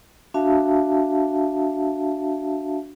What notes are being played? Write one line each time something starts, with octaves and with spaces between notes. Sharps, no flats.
D4 F#4 E5 F5 A5